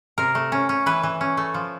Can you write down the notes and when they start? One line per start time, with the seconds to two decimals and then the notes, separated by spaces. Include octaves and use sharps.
0.18 C3 A#4
0.35 A3
0.52 C#4
0.69 C#4
0.86 E3 B4
1.03 E3
1.21 C#4
1.37 A3
1.54 F3